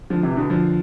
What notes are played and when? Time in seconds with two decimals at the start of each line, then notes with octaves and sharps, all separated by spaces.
0.10 D3 F3
0.23 C3 E3
0.36 B2 D3
0.50 D3 F3